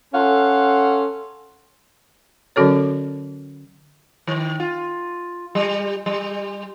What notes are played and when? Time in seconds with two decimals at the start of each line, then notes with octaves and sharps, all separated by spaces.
0.14 C#4 A4 F5 F#5 C6
2.56 D3 F#3 C#4 F#4 A4 C#5
4.27 D#3
4.60 F4
5.55 G3
6.06 G3